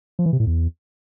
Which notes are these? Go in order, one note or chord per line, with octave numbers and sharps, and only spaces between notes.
F3
E3
C3
A2
E2